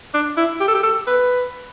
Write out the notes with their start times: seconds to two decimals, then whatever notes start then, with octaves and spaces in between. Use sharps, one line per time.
0.14 D4
0.37 E4
0.60 G4
0.68 A4
0.75 G4
0.83 A4
1.07 B4